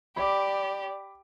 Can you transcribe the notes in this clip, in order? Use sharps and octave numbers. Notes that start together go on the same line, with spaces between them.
G4 D5 B5 D6